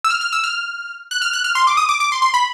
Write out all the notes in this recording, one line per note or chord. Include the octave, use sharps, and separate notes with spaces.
E6
F6
F6
E6
F6
F#6
F6
F#6
F6
C6
D6
D#6
D6
D6
C6
C6
B5